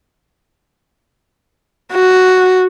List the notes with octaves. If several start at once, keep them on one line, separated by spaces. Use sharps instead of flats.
F#4